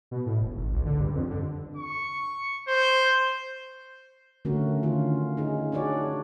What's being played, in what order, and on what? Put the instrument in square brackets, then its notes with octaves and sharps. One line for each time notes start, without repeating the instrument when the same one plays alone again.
[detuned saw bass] B2
A2
E1
G#1
C#2
D3
G2
F2
D3
[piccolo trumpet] C#6
C5
[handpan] D3 A3 C#4 F#4 A#4
D3 D#3 C#4 F4
D#4 G#4
D4 D#4 F#4 G#4 C#5 D5